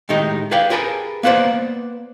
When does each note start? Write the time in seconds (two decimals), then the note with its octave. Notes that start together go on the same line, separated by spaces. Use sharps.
0.09 A2 D#3 G#3 D#4 G4
0.51 G#4 B4 D5 F5 G5
0.70 G4 G#4 A#4 B4 G#5 A5
1.23 A#3 B3 B4 C5 D5